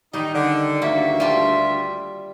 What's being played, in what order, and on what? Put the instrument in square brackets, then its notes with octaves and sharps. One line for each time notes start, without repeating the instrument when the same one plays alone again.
[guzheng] D#3 G3 [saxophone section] D#4
[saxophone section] D3
[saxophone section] D2 G2 E5 [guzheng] A#3 F#4
[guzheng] G3 F4 A5